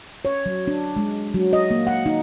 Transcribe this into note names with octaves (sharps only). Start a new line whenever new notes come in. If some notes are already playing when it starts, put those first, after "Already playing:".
C#5
F#3
D4
G#3
F#3
D#5
A#3
F#5
D#4